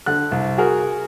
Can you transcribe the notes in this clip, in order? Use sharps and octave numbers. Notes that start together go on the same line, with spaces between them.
D3 F#6
C2
F#4 G#4 A#4